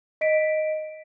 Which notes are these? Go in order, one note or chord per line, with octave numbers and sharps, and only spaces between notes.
D#5 B6 D7